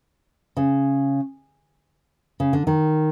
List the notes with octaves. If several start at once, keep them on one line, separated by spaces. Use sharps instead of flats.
C#3
C#3
D3
D#3